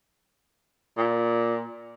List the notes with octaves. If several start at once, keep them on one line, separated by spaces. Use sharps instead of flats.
A#2